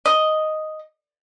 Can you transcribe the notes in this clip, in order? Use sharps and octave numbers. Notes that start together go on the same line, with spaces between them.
D#5